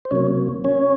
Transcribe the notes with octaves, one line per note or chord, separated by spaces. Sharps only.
C5
C3 F#3 A#3 C#4 C#5
C#4 C#5